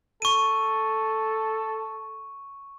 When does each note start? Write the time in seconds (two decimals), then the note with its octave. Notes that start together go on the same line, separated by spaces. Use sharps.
0.22 A4 C#6 D#7